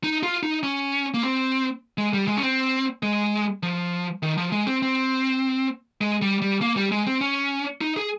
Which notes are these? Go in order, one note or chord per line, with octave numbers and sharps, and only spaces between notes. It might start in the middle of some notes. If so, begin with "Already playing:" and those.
D#4
F4
D#4
C#4
A#3
C4
G#3
G3
G#3
C#4
C4
G#3
F3
D#3
F3
G#3
C4
C4
G#3
G3
G3
A#3
G3
G#3
C4
C#4
D#4
G#4